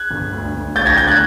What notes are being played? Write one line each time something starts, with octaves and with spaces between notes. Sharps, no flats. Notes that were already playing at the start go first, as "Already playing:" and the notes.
Already playing: F#6 G#6
G1
D2
D2
D2 G6 A6
G#6 A#6
D2 G6 A6
F#6 G#6